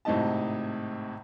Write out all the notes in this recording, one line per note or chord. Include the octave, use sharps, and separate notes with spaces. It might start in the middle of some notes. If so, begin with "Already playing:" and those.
G#1 A2 C3 D#4 D#5 A5